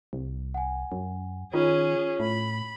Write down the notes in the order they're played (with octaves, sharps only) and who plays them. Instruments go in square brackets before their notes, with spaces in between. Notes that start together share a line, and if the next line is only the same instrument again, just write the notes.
[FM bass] C2
[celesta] F#5 G#5
[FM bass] F#2
[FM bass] D#3 [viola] C#4 G#4 [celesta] F4
[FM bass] A2 [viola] B5